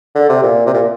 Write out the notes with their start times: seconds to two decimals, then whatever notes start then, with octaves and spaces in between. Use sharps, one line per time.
0.15 D3
0.29 C3
0.43 A#2
0.66 C3
0.74 A#2